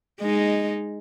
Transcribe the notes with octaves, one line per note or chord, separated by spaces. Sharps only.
G#3 D#4